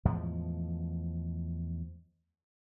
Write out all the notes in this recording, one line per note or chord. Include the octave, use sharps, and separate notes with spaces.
E2 A2 F3 G#3